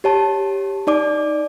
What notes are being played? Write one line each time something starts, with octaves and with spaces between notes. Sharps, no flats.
G4 C#5 A5
D#4 D5 D6